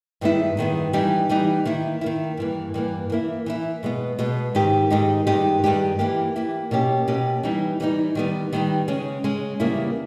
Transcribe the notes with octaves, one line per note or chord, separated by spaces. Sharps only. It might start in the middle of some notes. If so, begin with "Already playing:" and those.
G2 D#3 G#3 B3 E4
G2 D#3 G#3 B3 E4
E3 G3 B3 D#4 G4
E3 G3 B3 D#4 G4
D#3 A#3 E4
D#3 A#3 E4
G2 E3 A#3
G2 E3 A#3
E3 A#3 E4
E3 A#3 E4
B2 G#3 B3
B2 G#3 B3
G#2 D#3 G#3 D#4 G4
G#2 D#3 G#3 D#4 G4
G2 D#3 G#3 D#4 G4
G2 D#3 G#3 D#4 G4
E3 A#3 E4 G4
E3 A#3 E4 G4
B2 A#3 C#4 G4
B2 A#3 C#4 G4
E3 G3 B3 D#4
E3 G3 B3 D#4
D#3 G3 B3 D#4
D#3 G3 B3 D#4
C#3 G#3 C#4
C#3 G#3 C#4
E2 C#3 G3 A#3 E4